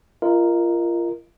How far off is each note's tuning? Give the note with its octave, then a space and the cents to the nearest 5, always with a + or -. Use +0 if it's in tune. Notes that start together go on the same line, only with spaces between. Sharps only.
F4 -30 A#4 +0 D#5 +0